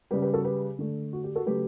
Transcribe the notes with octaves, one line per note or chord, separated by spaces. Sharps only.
C#3 G3 G4 B4
G4 B4
F#4 A4
G4 B4
D3 A3
F#4
G4
F#4 A4
C#3 F#3 A3 G4 B4